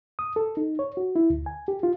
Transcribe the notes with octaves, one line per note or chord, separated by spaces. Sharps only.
D#6
A4
D#4
C#5
F#4
E4
D2
G#5
G4
F4